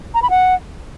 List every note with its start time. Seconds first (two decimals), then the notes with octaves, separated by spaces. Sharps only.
0.15 A#5
0.22 B5
0.30 F#5